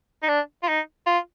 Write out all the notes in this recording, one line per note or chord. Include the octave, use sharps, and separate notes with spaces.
D#4
D4
F4
D#4
F4